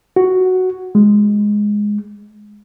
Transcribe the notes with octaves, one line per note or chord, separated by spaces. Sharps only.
F#4
G#3